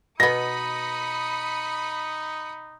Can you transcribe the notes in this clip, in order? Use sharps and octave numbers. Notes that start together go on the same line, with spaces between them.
B2 B3 D#4 B5 D#6 A#6 C#7